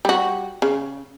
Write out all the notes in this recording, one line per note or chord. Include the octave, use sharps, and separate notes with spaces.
G3 F#4
C#3